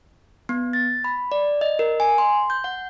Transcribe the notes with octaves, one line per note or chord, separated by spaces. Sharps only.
B3
A6
B5
D5
D#5
A#4
G#5
C6
G6
F#5